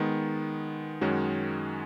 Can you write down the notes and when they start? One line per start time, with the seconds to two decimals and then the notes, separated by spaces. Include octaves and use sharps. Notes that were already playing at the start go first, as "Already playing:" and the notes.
Already playing: D#3 G#3 B3
1.01 F#2 D#3 G#3 C#4 F#4